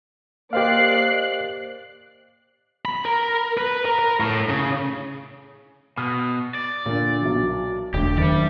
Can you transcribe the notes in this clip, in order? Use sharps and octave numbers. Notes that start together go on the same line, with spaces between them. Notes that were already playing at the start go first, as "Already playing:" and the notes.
A#3 G4 C5 D5 D#5 F5 F#6 C7
B5
A#4
B4
A#4
A#4
A2
C#3
B2 D#6
D5
A#2 D3
B1 F#3
E1 D3 A3 G4
F#1 D#3 G4 D5 C#7